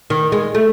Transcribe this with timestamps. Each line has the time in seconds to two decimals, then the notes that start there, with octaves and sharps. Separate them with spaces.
0.10 D#3
0.32 G#3
0.55 A3